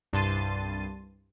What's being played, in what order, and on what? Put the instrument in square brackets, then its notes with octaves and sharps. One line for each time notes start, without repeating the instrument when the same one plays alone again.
[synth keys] C2 G2 A5 C6 A6 D#7